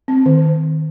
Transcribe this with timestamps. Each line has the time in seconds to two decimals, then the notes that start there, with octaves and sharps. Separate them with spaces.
0.08 C4
0.26 D#3